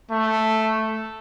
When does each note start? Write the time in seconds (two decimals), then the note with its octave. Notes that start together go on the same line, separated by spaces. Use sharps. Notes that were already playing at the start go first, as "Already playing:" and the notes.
0.11 A3